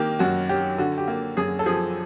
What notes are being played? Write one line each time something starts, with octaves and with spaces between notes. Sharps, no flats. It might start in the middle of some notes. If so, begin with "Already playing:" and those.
Already playing: D#3 A#3 G4
F#2 F#4
F#3 G4
D3 F#4
G4
A#3
F#2 G#4
A4
F3 G#4